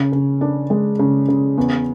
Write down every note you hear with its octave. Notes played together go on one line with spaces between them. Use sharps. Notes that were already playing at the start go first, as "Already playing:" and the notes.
Already playing: C#3
C#3
D4
G#3
C#3
C#3
E2